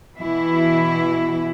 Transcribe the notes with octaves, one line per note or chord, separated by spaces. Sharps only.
B2 E3 E4